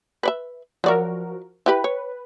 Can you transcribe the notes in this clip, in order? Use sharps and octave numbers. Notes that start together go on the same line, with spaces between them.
B4 D5 E5
F3 F#3 F#4 A#4 D5 E5
E4 G4 B4 B5
C#5